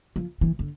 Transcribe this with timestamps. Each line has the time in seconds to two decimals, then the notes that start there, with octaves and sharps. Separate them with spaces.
0.16 F3
0.41 E3
0.59 D3